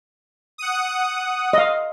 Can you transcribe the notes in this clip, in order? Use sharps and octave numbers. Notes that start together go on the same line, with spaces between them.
F#5 D#6
D#5 F5